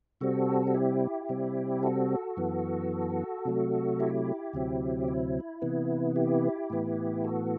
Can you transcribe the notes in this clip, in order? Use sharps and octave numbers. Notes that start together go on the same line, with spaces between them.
C3 G3 C4 F#4 A4
F#4
E4 G4
C3 G3 C4
F#4 A4
F#2 E3 B3
C3 F#3 A3
E4 G4
D2 C3 F#3 C4
E4
C3 E3 B3
E4 G4
A2 E3 B3
F#4 A4